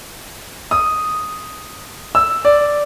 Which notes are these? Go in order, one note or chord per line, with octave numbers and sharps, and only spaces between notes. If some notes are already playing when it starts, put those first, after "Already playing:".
D#6
E6
D5